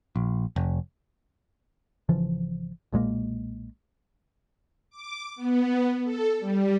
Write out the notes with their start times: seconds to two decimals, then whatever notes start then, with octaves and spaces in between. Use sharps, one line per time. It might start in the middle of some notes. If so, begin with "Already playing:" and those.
0.16 A#1
0.56 F1
2.09 G#1 C#3 E3 F3
2.92 B1 A#2 G#3 A#3
4.90 D6
5.36 B3
6.04 A4
6.39 G3